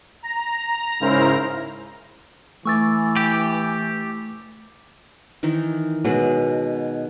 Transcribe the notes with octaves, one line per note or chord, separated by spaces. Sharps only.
A#5
G#2 C#3 E4 A#4 C5 A#5
E3 A3 G#5 C#6 D6 E6 A6
G4
D#3 E3 D#4
B2 F#3 G#3